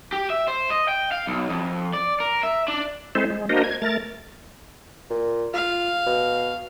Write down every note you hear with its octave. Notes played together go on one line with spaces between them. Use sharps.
G4
E5
C5
D#5
G5
F5
B1
F2
D5
A#4
E5
D4
G#3 C4 E4 A4 C5
G#3
A#3 D4 F#4 A#4 C5 D#5
G#6
A3 A#4 A6
A#2
F4 F5
B2